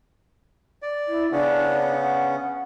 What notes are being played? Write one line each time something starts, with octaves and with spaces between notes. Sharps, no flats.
D5
E4
C#3 B3 C#4 D4
F#5